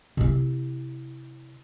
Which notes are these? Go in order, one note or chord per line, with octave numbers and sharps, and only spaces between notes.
C3 E4